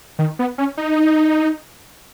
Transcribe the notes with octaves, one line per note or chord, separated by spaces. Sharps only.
D#3
B3
C#4
D#4